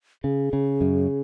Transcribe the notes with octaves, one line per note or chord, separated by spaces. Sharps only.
C#3 G#4
C#3
F#2